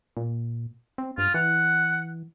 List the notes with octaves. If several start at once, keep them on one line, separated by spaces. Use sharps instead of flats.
A#2
C4
G2 F4
E3 F#5